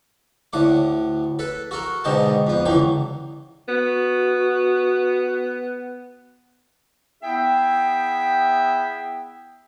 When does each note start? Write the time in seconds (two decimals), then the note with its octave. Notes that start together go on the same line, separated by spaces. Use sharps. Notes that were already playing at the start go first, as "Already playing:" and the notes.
0.53 D2 A2 F#5 D6
1.39 A4 B4
1.71 F#4 A4 A#4
2.04 G#2 B2 D3 D#5 G5 A5
2.47 F2 B3
2.65 C#2 D3 E3 F#3 G5
3.68 B3 F#4
7.23 B3 E4 G#4 E5 G5